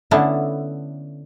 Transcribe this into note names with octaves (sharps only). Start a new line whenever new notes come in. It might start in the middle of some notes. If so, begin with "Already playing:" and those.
D3 A3 B3 C#4 D4 E4